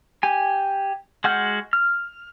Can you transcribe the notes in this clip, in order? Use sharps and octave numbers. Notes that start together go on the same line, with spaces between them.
G4 G#5
G#3 F#4 F#5 F6 G6
F6